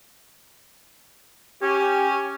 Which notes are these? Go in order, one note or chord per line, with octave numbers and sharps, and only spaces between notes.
C#4 G4